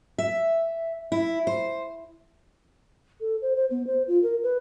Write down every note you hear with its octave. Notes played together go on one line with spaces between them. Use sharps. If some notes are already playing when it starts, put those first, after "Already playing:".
E5
E4
C5
A4
C5
C5
B3
C5
F4
A#4
B4